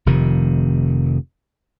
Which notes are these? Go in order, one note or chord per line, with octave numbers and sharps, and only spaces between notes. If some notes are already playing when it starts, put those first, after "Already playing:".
F1 F2 C3 D#3